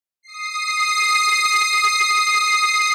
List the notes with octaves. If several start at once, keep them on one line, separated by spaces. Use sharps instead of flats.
D#6 C7